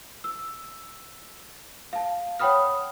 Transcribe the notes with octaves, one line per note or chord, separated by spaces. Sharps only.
E6
F5 A5
C#5 F#5 G5 B5 D#6 F6